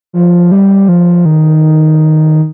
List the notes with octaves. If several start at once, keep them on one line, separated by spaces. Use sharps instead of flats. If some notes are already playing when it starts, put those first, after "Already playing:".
F3
G3
F3
D#3